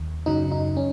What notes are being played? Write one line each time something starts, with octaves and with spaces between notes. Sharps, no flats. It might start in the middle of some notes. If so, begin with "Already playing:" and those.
Already playing: D#2
F#2 C#3 F#3 D#4
D#4
C#4